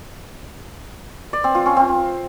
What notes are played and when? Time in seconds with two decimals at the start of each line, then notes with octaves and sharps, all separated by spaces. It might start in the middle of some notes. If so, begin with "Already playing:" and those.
1.33 D5
1.44 C4
1.55 F4
1.66 C#4
1.77 C4